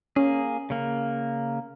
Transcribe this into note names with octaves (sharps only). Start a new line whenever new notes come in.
A#3 C#4 G#4
C#3 A#3